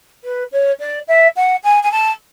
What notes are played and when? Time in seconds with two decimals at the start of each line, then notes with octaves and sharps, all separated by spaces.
0.24 B4
0.52 C#5
0.79 D5
1.08 E5
1.36 F#5
1.63 G#5
1.83 G#5
1.91 A5